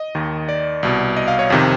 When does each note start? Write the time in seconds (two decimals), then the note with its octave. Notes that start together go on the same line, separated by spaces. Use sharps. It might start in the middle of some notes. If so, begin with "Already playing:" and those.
Already playing: D#5
0.15 D#2 D#3
0.49 D5
0.83 C2 B2
1.17 D#5
1.28 F5
1.39 C#5
1.50 F2 C3 D#3